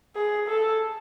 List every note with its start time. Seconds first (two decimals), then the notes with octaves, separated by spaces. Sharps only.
0.16 G#4
0.48 A4